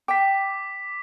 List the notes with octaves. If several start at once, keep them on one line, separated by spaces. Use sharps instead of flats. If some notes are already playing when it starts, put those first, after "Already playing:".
G5 D6 B6